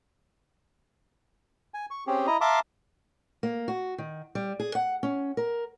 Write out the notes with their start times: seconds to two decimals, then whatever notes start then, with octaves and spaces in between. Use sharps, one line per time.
1.74 G#5
1.91 C#6
2.07 C4 C#4 G4 G#4
2.27 E4 D#5 A#5
2.41 E5 F5 A5 A#5 C6 D6
3.43 A#3
3.68 F#4
3.98 D#3
4.35 G3
4.60 G#4
4.75 F#5
5.03 C#4
5.37 A#4